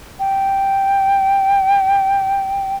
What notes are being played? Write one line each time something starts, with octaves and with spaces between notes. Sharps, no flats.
G5